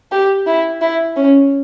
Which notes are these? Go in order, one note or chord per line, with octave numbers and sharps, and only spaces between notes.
G4
E4
E4
C#4